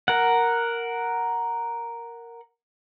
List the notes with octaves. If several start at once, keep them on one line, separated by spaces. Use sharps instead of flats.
A#4 F#5